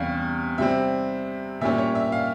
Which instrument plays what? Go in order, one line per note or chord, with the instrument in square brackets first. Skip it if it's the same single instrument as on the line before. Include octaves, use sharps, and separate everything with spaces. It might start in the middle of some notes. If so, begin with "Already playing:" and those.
Already playing: [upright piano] E2 C3 G3 C#4 F5
C3 G3 C4 E5
A#2 G3 C#4 E5
C#5
E5
F5